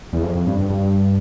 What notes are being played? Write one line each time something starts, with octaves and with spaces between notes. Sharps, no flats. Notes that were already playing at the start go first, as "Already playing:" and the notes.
E2
F2
F2
G2
G2
G2